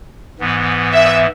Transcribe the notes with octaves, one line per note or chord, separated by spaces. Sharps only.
G#2 E3 B3
E5